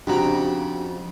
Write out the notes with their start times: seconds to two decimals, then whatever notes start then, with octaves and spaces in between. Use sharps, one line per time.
0.07 F2 C#3 D4 F#4 G4 G5 A#5